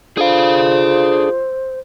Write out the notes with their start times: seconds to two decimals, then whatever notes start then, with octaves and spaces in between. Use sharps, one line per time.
0.17 D4 F4 G#4 A4 C5 F5